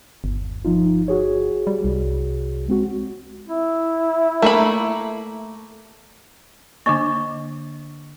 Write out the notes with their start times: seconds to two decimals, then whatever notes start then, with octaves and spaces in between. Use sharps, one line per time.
0.24 G1 D#2
0.65 F3 D#4 F4
1.08 F#4 G#4 C#5
1.67 G3
1.84 C2
2.68 G#3 C4 F#4
3.48 E4
4.42 A3 A#3 B5
6.86 D3 A#3 D4 D#5 C#6